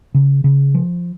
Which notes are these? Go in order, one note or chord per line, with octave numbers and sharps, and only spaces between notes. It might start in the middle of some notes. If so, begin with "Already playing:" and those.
C#3
C#3
F3